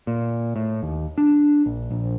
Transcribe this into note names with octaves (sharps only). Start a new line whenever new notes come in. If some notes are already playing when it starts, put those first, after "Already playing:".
A#2
A2
D#2
D4
A#1
A#1